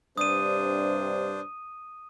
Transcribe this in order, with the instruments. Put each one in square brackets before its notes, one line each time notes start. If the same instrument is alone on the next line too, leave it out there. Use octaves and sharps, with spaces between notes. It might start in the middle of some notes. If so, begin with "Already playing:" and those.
[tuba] G2 [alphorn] C3 [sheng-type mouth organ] D4 C5 [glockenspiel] D#6 D#7